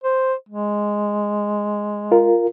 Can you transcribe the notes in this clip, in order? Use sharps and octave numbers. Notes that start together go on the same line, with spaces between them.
C5
G#3
F4 A#4